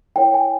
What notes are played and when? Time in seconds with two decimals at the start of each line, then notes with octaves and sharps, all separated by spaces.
0.16 E4 A#4 C#5 G5
0.34 G#5